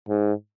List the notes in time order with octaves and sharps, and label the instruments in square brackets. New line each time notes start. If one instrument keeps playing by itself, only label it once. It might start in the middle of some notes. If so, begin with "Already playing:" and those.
[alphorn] G#2